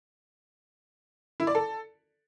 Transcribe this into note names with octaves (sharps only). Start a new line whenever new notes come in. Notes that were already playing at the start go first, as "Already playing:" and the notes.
E4
D5
A4